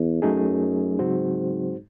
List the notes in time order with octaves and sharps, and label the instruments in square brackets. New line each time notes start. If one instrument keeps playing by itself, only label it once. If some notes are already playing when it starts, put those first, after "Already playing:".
Already playing: [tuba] E2
[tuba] F#2 [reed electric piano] F#3 A3 D#4 G#4
[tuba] G#2 [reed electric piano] C#3 F#3 C4 F#4 C5